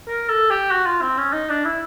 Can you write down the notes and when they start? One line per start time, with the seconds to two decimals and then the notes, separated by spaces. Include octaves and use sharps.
0.08 A#4
0.29 A4
0.50 G4
0.71 F#4
0.86 F4
1.01 C4
1.18 C#4
1.33 D#4
1.49 D4
1.65 E4